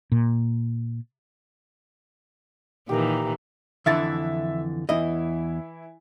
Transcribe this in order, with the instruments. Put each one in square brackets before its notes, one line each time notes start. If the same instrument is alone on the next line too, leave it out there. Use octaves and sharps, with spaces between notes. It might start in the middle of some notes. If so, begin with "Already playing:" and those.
[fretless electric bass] A#2
[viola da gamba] A#2 D#3 E3 [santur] G4 A#4 A#5
[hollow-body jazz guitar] F2 D3 E3 [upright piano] E5 A6
[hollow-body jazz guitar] E2 D#5 [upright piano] E3 E4